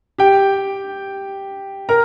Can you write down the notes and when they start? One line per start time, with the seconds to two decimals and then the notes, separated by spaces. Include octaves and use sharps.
0.18 G4 G5
1.89 A#4 A#5